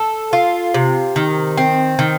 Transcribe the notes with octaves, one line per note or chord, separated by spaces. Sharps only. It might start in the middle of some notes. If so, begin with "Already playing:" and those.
Already playing: A4
F4
C3
D#3
C4
D#3